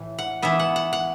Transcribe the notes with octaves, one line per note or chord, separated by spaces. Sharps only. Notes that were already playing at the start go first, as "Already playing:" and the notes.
Already playing: A2 E3
F#5
E3 B3 E5
F#5
F#5
F#5